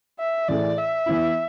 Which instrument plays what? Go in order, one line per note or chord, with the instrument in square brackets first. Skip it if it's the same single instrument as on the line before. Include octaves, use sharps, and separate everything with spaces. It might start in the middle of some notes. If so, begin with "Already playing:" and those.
[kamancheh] E5
[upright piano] A2 E3 A3 E4 G#4 [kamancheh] D5
[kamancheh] E5
[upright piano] E3 B3 E4